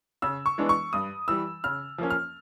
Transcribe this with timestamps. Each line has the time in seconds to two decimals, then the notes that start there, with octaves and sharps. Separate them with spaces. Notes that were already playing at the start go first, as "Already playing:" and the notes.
0.22 C#3 E6
0.46 C#6
0.58 E3 G#3 B3 D4
0.69 C#6
0.93 G2 D#6
1.28 E3 G3 E6
1.64 C#3 F6
1.98 F3 A#3 C#4
2.10 F6